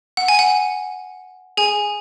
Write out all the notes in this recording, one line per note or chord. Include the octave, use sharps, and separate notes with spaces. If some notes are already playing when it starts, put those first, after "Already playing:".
F#5
G#5
F#5
G#4 G#5